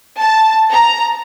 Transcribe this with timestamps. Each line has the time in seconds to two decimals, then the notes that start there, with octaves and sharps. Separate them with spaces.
0.20 A5
0.71 A#5